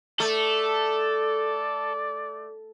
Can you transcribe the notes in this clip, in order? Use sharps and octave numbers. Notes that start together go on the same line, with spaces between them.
A3 A4 D5